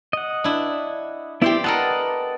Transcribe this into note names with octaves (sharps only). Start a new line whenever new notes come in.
D#5 F#5
D4 E4
B3 E4 G4 C5 D5
B3 A4 A#4 D#5 F#5 A5